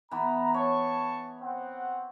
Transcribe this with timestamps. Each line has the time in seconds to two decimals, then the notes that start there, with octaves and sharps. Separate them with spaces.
0.11 E3 B3 A#5
0.54 C#5 A5 C#6
1.41 C4 F#5